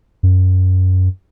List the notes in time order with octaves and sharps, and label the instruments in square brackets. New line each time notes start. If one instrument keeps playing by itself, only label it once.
[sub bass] F#2